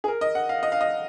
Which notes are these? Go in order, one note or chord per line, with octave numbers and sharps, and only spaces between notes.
G#4
A#4
D#5
F#5
F5
D#5
F5
D#5